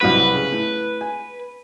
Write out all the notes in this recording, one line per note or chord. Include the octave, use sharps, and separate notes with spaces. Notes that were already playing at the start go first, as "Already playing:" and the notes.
C2 F#3 F#4 B4
C#3
A2
G#5